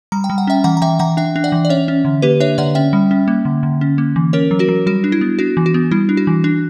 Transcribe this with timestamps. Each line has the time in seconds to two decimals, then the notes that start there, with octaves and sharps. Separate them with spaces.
0.12 G3 A#5
0.24 G5
0.30 G3
0.38 F#5
0.47 C#4 E5 G5
0.64 E3 F#5 A#5
0.77 A#5
0.82 E3 E5 G5
0.99 E3 F#5 A#5
1.17 D4 E5 G5
1.36 D4
1.44 D5 F#5
1.52 E3
1.65 D5
1.70 C#4 C#5 E5
1.88 C#4
2.05 D3
2.22 A#3 G4 B4
2.40 D4 C#5 E5
2.58 D3 D5 F#5
2.75 C#4 E5 G5
2.93 G3
3.11 C#4
3.28 A#3
3.45 D3
3.63 D3
3.81 C#4
3.98 A#3
4.16 E3
4.33 C#4 A#4 C#5
4.51 F#3
4.59 F#4 A#4
4.69 F#3
4.86 G3 F#4
5.04 D4
5.12 E4
5.21 B3
5.39 D4 F#4
5.57 E3
5.66 F#4
5.74 B3
5.91 G3 E4
6.09 D4
6.17 F#4
6.27 E3
6.44 D4